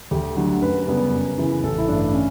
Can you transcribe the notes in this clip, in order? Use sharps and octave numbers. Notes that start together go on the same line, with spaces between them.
D2 G4
D3 F#3 A3
F#2 B4
C#3 G3 B3
F#2
C#3 E3
A1 A4
E4
G2 D3 A3 D4
C#4